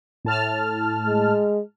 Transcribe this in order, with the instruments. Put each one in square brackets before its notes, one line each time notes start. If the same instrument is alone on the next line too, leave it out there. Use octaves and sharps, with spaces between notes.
[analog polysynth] A2 A5 F6
[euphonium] G#3